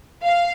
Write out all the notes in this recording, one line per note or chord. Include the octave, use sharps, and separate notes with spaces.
F5